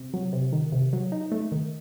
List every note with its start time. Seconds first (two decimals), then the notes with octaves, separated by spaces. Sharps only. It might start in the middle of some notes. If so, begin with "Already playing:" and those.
Already playing: C3
0.14 F#3
0.33 C3
0.53 D#3
0.72 C3
0.93 F#3
1.12 D#4
1.32 A3
1.52 D#3